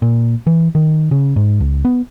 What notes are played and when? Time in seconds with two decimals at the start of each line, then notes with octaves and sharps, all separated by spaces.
0.02 A#2
0.47 E3
0.75 D#3
1.11 C#3
1.36 G#2
1.60 C#2
1.85 B3